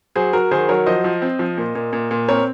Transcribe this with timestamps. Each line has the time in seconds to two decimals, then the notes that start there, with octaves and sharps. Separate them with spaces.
0.16 F#3 G#4 C5
0.33 F#3 F#4 A#4
0.51 D#3 G#4 C5
0.69 F#3 A#4 C#5
0.86 F3 C5 D#5
1.04 F3
1.22 C4
1.39 F3
1.57 A#2
1.75 A#2
1.93 A#2
2.11 A#2
2.28 C4 A#4 C#5